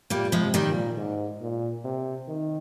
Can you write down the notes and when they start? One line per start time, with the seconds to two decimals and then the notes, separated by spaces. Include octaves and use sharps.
0.10 A#2 G3 A#3
0.32 F3 G#3
0.40 C3
0.54 D#3 G3
0.69 A#2
0.97 G#2
1.41 A#2
1.85 C3
2.28 D#3